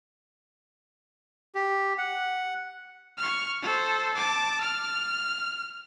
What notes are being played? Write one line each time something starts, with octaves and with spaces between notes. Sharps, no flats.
G4
F#5
C#6 F6
A4 C5
A5 D6
F6